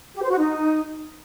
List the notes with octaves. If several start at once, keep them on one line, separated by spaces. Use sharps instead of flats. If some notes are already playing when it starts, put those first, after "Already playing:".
G4
C5
F#4
D#4